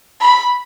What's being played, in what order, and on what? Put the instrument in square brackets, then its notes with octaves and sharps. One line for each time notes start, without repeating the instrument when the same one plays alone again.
[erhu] B5